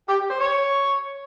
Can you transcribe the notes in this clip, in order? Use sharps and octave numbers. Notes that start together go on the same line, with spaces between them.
G4
G4
C5
C#5